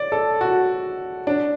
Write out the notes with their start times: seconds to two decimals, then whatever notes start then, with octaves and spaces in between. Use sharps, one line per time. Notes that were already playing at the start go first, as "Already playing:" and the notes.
Already playing: D5
0.12 A4
0.41 F#4
1.27 D4